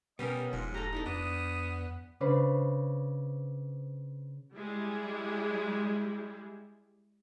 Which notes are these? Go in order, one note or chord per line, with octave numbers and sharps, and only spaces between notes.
B2 G3 B3 C#4 A#4 D#5
E1 G#2 F3
G4 A4 A#5
D#4 E4 A4
F2 B3 D4 D#6
C#3 D4 B4 C5
G3 G#3 E4 G4 G#4